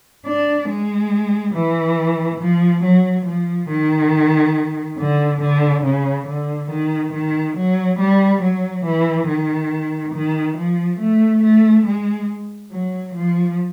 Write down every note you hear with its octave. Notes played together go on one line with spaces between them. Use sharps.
D4
G#3
E3
F3
F#3
F3
D#3
D3
D3
C#3
D3
D#3
D#3
F#3
G3
F#3
E3
D#3
D#3
F3
A3
A3
G#3
F#3
F3